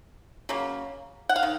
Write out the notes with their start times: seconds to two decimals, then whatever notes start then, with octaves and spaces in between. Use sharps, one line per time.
0.49 C#3 F#3 A#3
1.29 F#5
1.36 F5
1.43 D#3